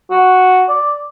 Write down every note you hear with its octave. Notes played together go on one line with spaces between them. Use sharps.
F#4
D5